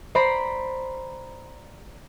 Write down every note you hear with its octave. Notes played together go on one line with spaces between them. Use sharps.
C5 D5 A#5 B5 A#6 C7